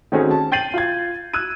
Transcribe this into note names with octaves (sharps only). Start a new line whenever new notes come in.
D#3 A3 C4 C#4 F#4 G#4
A5
G5 G6 A6 C7 D#7 F#7
F4 G#6
E6 F#6 G#6 D#7